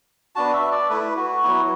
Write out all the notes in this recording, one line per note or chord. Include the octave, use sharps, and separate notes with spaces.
B3 D4 F#4 A5
E5
D5
A3 E4 B4
F#4
F#3 B3 E4